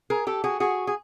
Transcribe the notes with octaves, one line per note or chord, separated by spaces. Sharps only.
G#4 A#4
G4 A4
F#4 G#4
F#4 G#4
G#4